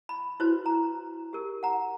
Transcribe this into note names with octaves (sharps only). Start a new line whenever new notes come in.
B5
E4 F#4 B4 C5
A#5
G4 A#4
F#5 A#5